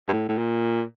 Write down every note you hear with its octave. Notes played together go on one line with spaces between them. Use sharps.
G2
A2
A2
A#2